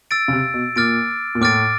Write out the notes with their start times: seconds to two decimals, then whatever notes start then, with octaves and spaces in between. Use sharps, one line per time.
0.11 E6 A6 D7
0.28 C#3
0.33 C3
0.54 B2
0.76 A#2 D6 F6 A6 D7
1.35 A#2
1.41 A2 D6 F6 A6 D7